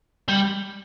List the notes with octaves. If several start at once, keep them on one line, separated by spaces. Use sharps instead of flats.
G3